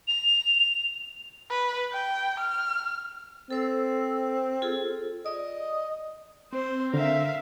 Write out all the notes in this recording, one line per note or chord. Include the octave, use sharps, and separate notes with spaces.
F7
B4
G5
F6
C4 A4 C5 E6
F4 G#4 A4
D5 D#5
C4 C5
D3 A#4 E5 F5